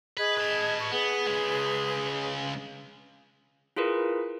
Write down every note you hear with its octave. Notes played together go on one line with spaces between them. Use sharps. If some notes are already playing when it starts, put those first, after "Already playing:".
G#4 B4 D#5 G#6
B4 A5
C#6
B3 G#4 B4
C#3 G#3
E4 F4 G#4 A#4 B4